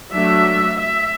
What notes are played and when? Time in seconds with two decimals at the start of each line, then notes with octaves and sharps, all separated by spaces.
0.12 F#3 A3 D4 E5
0.78 E5